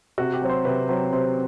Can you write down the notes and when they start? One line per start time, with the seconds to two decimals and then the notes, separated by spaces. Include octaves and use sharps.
0.18 C3 F#4
0.34 G4
0.42 F#3 C4
0.49 C5
0.65 C3 B4
0.89 F#3 C4
1.12 C3 C5